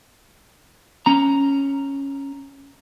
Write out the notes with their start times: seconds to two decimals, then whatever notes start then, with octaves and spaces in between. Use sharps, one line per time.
1.06 C#4 A#5